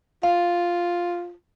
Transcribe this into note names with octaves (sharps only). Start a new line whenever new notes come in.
F4 F5